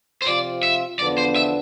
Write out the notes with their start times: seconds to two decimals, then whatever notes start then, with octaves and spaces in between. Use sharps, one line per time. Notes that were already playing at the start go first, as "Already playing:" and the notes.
0.22 C5
0.26 C3 F3 C4 F4 D5
0.63 E5
0.99 E2 D3 F3 B3 D4 D5
1.18 C5
1.36 E5